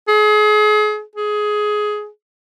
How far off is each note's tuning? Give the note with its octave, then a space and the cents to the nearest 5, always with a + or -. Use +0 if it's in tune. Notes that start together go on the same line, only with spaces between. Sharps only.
G#4 +35
G#4 +15